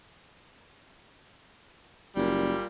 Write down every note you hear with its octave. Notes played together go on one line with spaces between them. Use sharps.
F#1 A#2 G3